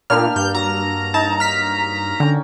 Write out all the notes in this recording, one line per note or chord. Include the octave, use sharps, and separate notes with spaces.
A#2 A#3 D4 G4 F6
G2 G6
F#3 A#5
D#4 A5
F6 B6
D3 C#4 G5